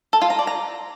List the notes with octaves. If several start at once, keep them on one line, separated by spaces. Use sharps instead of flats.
A4
F4
A#5
D5
A#5